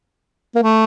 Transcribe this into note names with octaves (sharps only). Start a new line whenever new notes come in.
A#3
A3